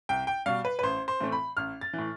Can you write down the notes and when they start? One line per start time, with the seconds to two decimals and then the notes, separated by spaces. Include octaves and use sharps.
0.09 C2 G5
0.27 G5
0.46 B2 G3 F5
0.65 B4
0.79 B4
0.83 A1 C5
1.08 C5
1.21 A2 E3 A3 C4
1.32 B5
1.57 A1 F6
1.81 A6
1.93 E3
1.99 A2